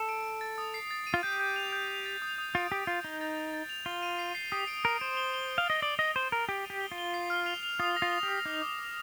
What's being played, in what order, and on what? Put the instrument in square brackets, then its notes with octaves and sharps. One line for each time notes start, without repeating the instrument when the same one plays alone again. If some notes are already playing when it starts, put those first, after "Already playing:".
Already playing: [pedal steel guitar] A4
[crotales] D7
D7
A6
D#6
C7
A6
D#7
[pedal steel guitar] F4
[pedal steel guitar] G4 [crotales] G6
[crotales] G6
F7
G6
D#6
A6
D#6
D#6
[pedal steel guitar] F4 [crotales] D7
[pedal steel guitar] G4 [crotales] D7
[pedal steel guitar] F4 [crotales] D#6
[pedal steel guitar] D#4 [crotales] G7
[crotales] A6
A6
A6
F7
[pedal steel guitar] F4 [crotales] G7
[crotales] D#7
C7
C7
[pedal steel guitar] G4 [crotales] D#6
[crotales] D7
[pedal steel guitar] A#4 [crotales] D#6
[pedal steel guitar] C5 [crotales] D7
[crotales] G7
G7
G7
[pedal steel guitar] F5
[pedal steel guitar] D#5 [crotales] A6
[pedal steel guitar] D5 [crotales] D#6
[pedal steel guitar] D#5 [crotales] F7
[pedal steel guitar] C5 [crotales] D#6
[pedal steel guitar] A#4 [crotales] F7
[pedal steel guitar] G4 [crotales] D#6
[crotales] D#7
[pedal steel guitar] G4
[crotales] G7
[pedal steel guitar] F4
[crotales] G7
C7
F6
F7
F7
[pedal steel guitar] F4 [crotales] D#6
[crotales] A#6
[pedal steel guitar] F4
[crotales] F7
[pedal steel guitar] G4
[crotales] D#6
[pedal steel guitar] D#4 [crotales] D6
[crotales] D6
D6